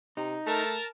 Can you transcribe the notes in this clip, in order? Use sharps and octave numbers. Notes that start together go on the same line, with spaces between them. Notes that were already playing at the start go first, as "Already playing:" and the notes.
C3 D#4
A3 A#4 A5